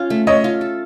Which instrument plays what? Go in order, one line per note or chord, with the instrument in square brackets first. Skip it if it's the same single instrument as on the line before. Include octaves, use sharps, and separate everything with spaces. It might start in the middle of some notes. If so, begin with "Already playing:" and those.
Already playing: [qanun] C#4 F4
A3
[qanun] A3 [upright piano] C#5 D#5
[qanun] F4
A4